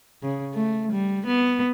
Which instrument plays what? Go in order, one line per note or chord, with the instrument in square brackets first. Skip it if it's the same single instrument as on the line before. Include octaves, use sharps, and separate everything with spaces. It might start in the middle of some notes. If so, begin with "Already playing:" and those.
[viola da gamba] C#3
A3
G3
B3